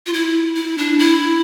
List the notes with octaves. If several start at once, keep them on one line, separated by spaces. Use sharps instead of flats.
F4
E4
E4
D4
E4